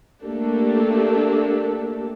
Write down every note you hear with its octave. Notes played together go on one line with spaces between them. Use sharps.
A3 A#3 D4 G4 A4